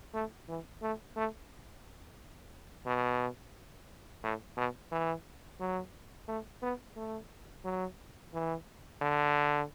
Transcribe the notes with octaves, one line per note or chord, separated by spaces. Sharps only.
A3
E3
A3
A3
B2
A2
B2
E3
F#3
A3
B3
A3
F#3
E3
D3